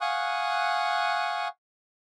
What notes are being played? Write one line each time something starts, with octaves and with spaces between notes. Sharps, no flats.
F5 F#5 G#5 C#6 D#6 F#6